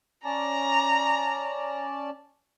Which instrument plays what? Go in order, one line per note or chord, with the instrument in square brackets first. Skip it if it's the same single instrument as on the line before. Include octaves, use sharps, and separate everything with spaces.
[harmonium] C#4 D5 A5 [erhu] A#5